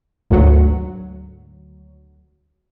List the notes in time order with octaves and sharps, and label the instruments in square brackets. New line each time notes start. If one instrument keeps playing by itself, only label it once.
[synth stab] G#1 D2 F#3